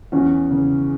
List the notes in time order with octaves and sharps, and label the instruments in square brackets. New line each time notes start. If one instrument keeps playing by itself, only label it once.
[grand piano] E2 [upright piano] C#4
[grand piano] C#3